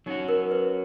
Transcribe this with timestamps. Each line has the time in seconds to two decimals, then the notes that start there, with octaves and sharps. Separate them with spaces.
0.06 F#3 C#4 D#4 F#4
0.28 A#4
0.51 B4